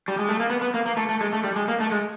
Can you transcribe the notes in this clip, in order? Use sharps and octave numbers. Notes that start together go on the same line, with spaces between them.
G3
G#3
A3
A#3
B3
B3
A#3
A#3
A3
A3
G#3
A3
G3
G#3
A#3
A3
G#3